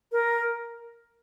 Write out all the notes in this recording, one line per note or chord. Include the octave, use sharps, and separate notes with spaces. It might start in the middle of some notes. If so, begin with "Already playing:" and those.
A#4